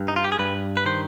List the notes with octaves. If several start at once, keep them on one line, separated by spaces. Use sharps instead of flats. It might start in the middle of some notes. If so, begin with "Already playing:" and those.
Already playing: G2
D#4
F4
G4
G#4
G2 B4
B4
D#3 C5